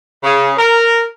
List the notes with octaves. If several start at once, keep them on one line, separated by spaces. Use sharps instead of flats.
C#3
A#4